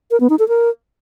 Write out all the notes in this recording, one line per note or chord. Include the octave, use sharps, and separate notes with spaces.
A#4
B3
D#4
A4
A#4